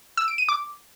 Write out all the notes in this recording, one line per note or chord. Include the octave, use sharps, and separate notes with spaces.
E6
D7
D#7
D6